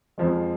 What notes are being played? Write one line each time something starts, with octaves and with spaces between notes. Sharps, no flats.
F2 F3 G#3